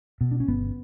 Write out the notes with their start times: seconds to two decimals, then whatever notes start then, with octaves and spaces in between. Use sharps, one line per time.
0.21 B2
0.32 D4
0.40 C#4
0.48 G1 B3